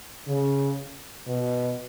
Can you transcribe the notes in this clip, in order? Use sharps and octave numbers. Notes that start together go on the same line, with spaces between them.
C#3
B2